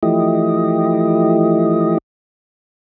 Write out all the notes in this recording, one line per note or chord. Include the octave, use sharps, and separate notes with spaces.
E3 F3 A3 E4 G4 D#5